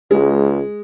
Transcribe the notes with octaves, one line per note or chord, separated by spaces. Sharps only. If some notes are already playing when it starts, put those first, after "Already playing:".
C#2 G#3